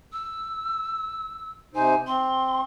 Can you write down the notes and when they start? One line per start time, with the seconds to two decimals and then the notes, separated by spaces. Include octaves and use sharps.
0.13 E6
1.75 C3 D#4 C5 G#5
2.07 C4 C6